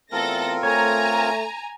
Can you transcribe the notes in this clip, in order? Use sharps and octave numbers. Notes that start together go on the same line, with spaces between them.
E2 A3 C4 F4 A4 A#4 A#6
A3 C#5 G#5 A#5